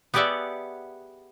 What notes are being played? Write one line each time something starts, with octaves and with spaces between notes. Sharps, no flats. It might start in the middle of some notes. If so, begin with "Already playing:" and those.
B3 G4 G#4 D5 E5 F#5